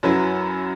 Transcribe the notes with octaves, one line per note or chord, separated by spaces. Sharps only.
F#2 F#3 E4 B4